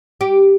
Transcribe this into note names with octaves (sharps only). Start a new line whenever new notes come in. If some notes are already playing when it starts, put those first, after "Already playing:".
G4